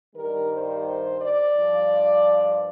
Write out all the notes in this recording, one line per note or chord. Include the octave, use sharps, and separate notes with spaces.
G2 D#3 G3 A#4
C5
D5
G2 F3